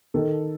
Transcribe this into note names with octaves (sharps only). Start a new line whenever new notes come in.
D#3 A4